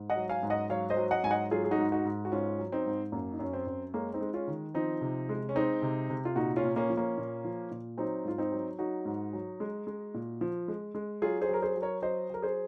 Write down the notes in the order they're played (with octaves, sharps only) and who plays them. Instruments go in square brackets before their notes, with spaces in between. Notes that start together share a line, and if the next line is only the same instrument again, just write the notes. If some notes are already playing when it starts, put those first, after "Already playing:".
Already playing: [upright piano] G#2
D#5 F#5
F#3
F5 G#5
G#2
D#5 F#5
F#3 C#5 F5
C5 D#5
F#3
D#5 F#5
G#2 G#5
D#5 F#5
F#3 F4 G#4
G#4
D#4 F#4
G#2
D#4 F#4
G#2
F#4
G#2 C#4 F4
F#3
C4 D#4
G#2
F#2 A#3
D#4
F#2 C#4
C4
F#2
G#3 A#3 C#4
C4 D#4
G#3
C#4 F4
D#3
F3 C4 D#4
C3
G#3
C#4
G#3 C4 D#4
C3
C3
F4
A#2 D#4 F#4
C#4 F4
A#2
A#3 C#4
F3
A#3 C#4
A#2
F3
A#2
F#3 C4 D#4
G#2 F4
C4 D#4
F#3
F#3 D#4 F#4
G#2
F#3
G#3
G#3
A#2
F3
G#3
G#3
F#3 F4 G#4
G#4 C5
F#3 A#4
G#4 C5
F#3
A#4 C#5
F#3 C5 D#5
F#3 A#4
G#4 C5